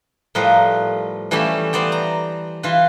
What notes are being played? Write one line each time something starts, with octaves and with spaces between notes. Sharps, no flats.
A2 F3 G3 A#4 B4 D#5
E3 G3 A3 C#4 G4 E5
B3 C5 D5 G5
A#5
E3 F4 B4